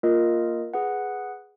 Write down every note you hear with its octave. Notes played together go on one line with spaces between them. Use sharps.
A#3 F4 A#4 D#5
G#4 B4 F#5